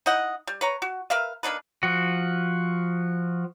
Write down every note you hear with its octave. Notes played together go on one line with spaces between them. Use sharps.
D#4 E4 D#5 F#5
G3
B4 C#5 A#5
F#4
A#4 B4 E5 F5
A#3 D4 D#4 B4
F3 F#4